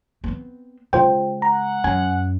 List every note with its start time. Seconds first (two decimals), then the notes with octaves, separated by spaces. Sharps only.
0.24 B3 C4
0.93 C#3 G#3 F4 C5 G5
1.42 F#5 A#5
1.84 F#2 G#5